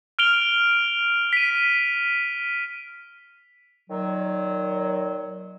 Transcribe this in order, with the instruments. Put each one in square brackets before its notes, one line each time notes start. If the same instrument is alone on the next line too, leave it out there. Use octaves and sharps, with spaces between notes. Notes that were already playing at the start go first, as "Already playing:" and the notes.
[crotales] F6 D7 F7 G7
B6 D#7
[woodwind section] A#2 D#3 F#3